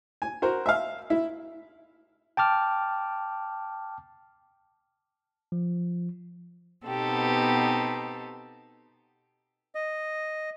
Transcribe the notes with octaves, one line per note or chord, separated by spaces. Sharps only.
G#5
F#4 A#4 C5
E5 F5
E4
G5 A5 D6 F6
F3
B2 B3 C4 D#4 G4 A4
D#5